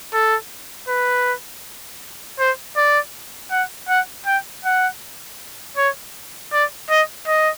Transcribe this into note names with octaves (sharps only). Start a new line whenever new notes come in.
A4
B4
C5
D5
F#5
F#5
G5
F#5
C#5
D5
D#5
D#5